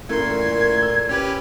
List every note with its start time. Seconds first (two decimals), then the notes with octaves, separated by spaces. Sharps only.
0.09 F#2 A#2 E3 A3 A#3 A#4 C6 G#6
0.82 E6
1.09 C#4 G4 B4